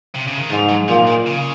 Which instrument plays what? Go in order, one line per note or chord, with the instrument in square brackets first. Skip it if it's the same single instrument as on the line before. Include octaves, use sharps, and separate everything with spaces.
[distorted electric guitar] C3
C#3
D#3
[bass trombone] G#2 [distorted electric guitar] F3
[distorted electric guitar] F#3
[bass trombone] A#2 [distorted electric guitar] F3
[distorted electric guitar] D#3
C#3